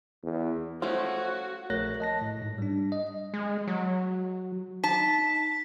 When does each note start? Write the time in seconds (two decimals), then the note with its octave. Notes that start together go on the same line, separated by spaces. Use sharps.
0.23 E2
0.82 F3 A3 C#4 F#4
1.70 A#1 A3 A#4 C#5 F#6 A#6
2.00 D#5 A5 A#6
2.21 A2
2.42 G#2
2.58 G3 D4
2.92 D#5
3.34 G#3
3.68 F#3
4.84 D#4 A5 B6